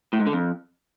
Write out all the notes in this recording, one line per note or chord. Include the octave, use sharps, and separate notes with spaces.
A2
G#2
D3
F2